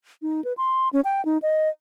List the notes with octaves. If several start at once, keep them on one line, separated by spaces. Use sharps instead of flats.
D#4
B4
C6
C#4
G5
D#4
D#5